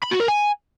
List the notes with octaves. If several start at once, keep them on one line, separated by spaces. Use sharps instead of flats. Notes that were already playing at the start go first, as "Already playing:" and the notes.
B5
F#4
A#4
G#5